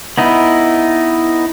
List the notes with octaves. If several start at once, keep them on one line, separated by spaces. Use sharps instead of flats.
B3 D#4 E4